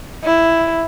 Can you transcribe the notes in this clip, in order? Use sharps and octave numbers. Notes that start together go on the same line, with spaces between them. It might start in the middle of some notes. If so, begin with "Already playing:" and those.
E4